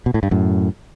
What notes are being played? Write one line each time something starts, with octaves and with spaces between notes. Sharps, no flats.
B2
A2
G2
F#2 A2